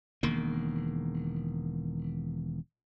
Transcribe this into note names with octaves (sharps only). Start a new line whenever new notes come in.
E1 D#3 A#3